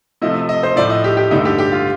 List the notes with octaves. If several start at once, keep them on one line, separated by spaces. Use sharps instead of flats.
C3 F3 A3 D#5
D#5
C5
A2 F3 A3 D5
D#5
G4
G4
G2 D3 A3 D#4
G4
G4
F4